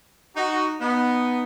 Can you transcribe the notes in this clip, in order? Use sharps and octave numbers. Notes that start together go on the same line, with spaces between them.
D#4 F#4
B3 D#4